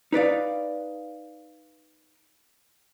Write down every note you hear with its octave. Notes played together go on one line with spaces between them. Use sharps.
D#4 B4 D5 F5